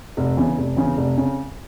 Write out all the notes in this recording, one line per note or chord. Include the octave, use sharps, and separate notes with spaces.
F1
E2 C#3
F1
E2 C#3
F1
C#3